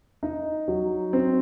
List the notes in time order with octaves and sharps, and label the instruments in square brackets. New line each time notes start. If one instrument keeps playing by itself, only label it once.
[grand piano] D#4
F#3
C4